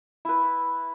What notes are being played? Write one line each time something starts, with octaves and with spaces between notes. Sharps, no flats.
E4 B4